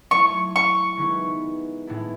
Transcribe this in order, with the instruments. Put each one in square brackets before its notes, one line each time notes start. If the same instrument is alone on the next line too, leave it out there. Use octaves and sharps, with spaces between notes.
[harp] F#3 A3 E4 A4 C#5 [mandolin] C#6
[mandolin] C#6
[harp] D#3 G#3 B3 E4 B4
A2 G#3 B3 E4 A4